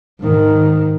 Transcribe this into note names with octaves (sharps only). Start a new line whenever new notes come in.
G#2 D#3